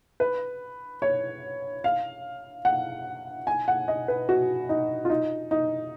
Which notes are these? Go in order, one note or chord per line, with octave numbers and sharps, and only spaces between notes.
B4
C#5
F5
F#5
G#5
F#5
D#5
B4
F#4
D#4
F4
D#4
D#4